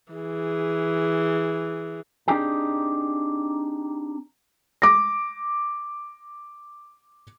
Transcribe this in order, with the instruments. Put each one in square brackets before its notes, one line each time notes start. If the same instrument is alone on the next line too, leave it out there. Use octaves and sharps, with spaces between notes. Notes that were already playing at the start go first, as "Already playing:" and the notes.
[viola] E3 G#4
[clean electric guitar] C4 D4 D#4 G4 G#4 G5
[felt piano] D6 A#6